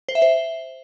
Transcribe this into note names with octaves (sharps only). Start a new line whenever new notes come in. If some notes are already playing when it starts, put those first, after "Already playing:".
C5
E5
C5